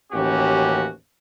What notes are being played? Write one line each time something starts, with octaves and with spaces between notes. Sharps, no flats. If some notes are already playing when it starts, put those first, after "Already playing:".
A1 D#2 C#4 F#4 G4